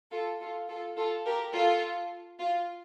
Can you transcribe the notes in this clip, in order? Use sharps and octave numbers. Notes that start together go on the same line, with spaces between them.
F4 A4
F4 A4
F4 A4
F4 A4
G4 A#4
F4 A4
F4